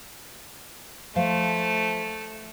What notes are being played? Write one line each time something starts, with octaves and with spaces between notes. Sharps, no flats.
F3 A3 C5 F5